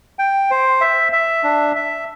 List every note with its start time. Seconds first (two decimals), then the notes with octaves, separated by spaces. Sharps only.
0.19 G5
0.51 C5
0.81 E5
1.12 E5
1.44 D4
1.76 E5